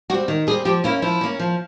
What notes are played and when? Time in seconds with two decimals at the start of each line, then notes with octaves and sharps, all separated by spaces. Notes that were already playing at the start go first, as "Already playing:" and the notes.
0.10 G3 C4 F#4
0.28 D#3
0.47 G3 G#4
0.51 C4
0.65 F3 G4
0.84 A#3 C#4 E4
1.02 F3 E4
1.21 A#3 C#4
1.39 F3